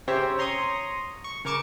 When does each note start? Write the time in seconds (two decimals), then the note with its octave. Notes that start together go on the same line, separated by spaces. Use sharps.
0.08 C#3 C4 G4 C5 C#5 E5
0.38 C#5 A#5 C6 C#6 D#6
1.24 C#6
1.45 C#3 A#4 C#6 D6 C#7 E7